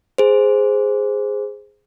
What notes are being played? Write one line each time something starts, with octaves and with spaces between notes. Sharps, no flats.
G#4 C5